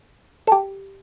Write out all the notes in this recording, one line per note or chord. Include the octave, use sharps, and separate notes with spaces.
A4
G4